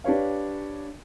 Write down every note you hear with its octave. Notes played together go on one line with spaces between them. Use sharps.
D4 G4 B4 C#5 F5